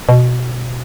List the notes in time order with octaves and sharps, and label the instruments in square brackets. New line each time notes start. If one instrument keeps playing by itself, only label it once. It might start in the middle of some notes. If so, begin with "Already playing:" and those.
[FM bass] B2